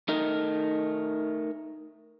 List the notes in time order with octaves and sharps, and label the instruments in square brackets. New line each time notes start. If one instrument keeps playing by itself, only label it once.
[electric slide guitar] A3 D#4 A#4